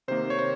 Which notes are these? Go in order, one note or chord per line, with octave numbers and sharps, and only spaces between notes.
C3 D#3 A#3 C5
C#5
C5